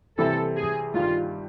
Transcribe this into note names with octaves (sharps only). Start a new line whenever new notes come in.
C3 E3 G3 C4 E4 A4
G#4
G2 D#3 G3 F4